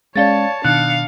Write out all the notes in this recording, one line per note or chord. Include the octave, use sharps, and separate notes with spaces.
G#3 C#4 C#5 D5 F5 A5 A6
B2 D#3 D4 F5 F#6 C#7